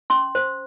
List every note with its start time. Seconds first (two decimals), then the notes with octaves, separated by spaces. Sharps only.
0.10 C#4 C6
0.35 C5